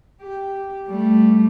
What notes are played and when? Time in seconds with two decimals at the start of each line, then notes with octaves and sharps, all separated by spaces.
0.21 G4
0.87 G3 A3